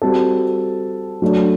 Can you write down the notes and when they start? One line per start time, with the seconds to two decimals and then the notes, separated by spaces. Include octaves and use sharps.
0.02 G3 C4 F#4 A4
1.22 F#3 A3 D4